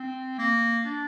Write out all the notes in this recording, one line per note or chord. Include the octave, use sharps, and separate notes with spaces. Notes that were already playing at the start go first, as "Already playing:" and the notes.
Already playing: C4
A#3
D4